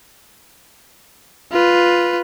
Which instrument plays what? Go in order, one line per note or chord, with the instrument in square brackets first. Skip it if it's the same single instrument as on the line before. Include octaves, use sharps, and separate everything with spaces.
[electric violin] F4 B4